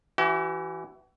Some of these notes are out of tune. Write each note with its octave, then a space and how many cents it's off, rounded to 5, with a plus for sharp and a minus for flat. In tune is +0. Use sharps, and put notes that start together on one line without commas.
E3 +10 F#4 +45